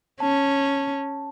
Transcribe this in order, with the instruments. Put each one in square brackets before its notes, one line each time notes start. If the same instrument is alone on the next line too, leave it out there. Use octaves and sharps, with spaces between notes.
[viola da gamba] C#4 [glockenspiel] A5